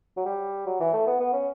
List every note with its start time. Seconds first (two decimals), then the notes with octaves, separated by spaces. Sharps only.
0.17 F#3
0.26 G3
0.66 F#3
0.80 E3
0.93 A3
1.07 B3
1.20 B3
1.33 C#4